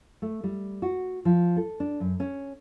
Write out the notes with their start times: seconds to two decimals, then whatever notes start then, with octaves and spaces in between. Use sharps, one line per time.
0.22 A3
0.44 G3
0.82 F#4
1.25 F3
1.57 A4
1.80 D4
2.00 F#2
2.20 C#4